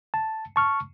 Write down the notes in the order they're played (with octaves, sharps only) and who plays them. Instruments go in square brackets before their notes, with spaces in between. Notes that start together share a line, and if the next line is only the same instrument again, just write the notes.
[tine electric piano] A5
A5 C#6 F6